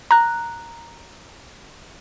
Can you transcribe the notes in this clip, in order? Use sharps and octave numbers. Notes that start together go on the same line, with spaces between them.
A#5 F#6